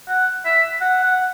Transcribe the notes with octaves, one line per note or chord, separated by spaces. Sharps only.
F#5
E5
F#5
F#5